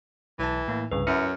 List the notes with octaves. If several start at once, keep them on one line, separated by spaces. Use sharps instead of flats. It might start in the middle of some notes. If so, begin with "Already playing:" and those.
B1 E3 A5
A2 A#3
C2 G2 C#3 B4
F#2 E4 E5 F6 C#7